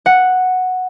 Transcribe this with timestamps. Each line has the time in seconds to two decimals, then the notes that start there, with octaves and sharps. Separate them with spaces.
0.06 F#5